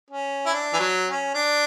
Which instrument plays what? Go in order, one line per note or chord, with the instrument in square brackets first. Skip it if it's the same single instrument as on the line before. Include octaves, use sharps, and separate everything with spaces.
[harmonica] C#4
E4
D4
E3
F#3
C#4
D4